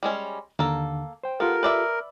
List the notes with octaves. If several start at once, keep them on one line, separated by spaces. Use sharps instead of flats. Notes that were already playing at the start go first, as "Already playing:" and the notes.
G3 G#3 C#4
D#2 D3 A#3 A4
C5 G5
B3 F4 G4 A4 A#4
B4 D5 E5